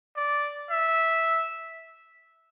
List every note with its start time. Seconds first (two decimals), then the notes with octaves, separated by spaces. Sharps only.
0.17 D5
0.71 E5